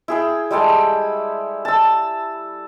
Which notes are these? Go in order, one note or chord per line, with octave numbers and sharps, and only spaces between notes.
E4 G#4 G5
G3 G#3 A4 G5
B5
A5 E6